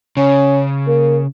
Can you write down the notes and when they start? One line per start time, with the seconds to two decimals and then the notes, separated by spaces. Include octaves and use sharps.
0.17 C#3 C#4
0.87 A#3